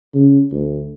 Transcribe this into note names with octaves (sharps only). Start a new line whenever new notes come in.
C#3
D2